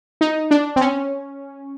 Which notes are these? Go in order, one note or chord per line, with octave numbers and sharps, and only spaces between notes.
D#4
D4
C4
C#4